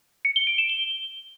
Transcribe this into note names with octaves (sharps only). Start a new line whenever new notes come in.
C#7
G7
D7
E7
G7